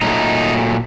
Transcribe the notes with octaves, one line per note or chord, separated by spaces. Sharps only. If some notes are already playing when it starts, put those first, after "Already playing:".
A#2 F#3 A3 D#4